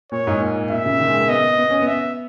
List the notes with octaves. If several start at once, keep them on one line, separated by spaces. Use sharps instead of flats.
A#2 C#5
G#2
A#2
A#2 E5
C#3
D#3
G#3
A#3
B3 D#5
B3
C#4
B3
E5